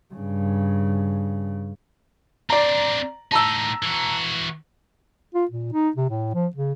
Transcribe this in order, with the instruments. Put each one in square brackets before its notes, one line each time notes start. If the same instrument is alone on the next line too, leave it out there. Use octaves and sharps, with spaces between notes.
[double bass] G2 C#3
[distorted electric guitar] C4 D4 [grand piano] D5 A#5
[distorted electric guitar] A2 D#4 [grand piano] A5 A#5 E6
[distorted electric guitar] E3 F#4
[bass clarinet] F4
A#2
D#4
C3
A2
F3
C#3